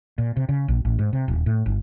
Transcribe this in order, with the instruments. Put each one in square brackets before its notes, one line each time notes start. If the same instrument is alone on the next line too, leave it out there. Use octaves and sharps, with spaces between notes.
[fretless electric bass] A#2
C3
C#3
A#1
A1
G#2
C3
D#1
A2
G1